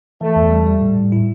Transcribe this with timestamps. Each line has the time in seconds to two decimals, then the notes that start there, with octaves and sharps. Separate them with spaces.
0.21 E3 A3
0.36 E2
0.51 G3
0.66 G3
0.81 A2
0.97 A2
1.12 E4